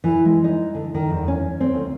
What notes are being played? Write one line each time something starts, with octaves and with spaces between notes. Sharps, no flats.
E3
G#3
D#4
D3
D#3
E2
C#4
C4
D2